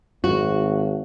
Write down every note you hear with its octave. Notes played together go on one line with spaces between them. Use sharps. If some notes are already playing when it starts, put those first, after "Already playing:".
G#1 F#4